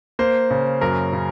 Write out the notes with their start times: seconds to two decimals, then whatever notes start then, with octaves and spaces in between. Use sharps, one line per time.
0.19 A#3 C5
0.51 C#3
0.81 F#2 A#4
1.13 C#3